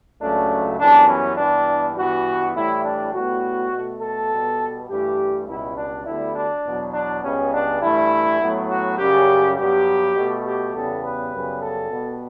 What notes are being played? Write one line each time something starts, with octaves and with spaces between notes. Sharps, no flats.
C#2 C#3 F#3 A3 D4
F#2 E3 G3 B3 D4
C#4
G2 E3 G3 B3 D4
G2 E3 B3 F#4
A2 E3 G3 E4
D4
A2 G3 B3 F#4
B2 A3
A4
B2 G3 B3
G2 E3 A3 G4
C#2 B2 G3 E4
D4
D2 D3 G3 B3 E4
D4
E2 B2 F#3
D4
C#2 C#3 G3 B3 C#4
D4
G2 E3 A3 E4
A2 F#3 B3
F#4
F#2 C#3 G3 G4
G2 F#3 B3 G4
B2 A3
G4
E2 C#3 G3 B3 A4
B4
F#2 C#3 G3 B3
A4
B2 G3 B3